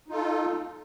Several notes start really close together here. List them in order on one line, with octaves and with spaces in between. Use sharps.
D#4 F4 A4